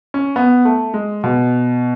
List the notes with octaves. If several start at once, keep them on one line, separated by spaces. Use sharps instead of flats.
C#4
B3
A3
G#3
B2